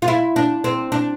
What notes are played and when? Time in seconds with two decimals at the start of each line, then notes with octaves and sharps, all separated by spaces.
0.02 F4
0.08 E4
0.36 D4
0.64 C4
0.92 D4